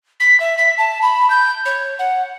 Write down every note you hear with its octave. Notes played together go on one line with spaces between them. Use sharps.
B6
E5
B6
A5
B5
G6
C#5
F#5